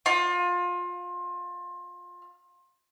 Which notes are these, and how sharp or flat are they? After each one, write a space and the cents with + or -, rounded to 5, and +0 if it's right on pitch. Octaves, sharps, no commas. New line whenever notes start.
F4 +25